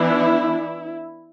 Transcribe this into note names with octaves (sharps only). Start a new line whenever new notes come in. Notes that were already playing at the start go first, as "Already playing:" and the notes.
Already playing: E3 B3 D4 E4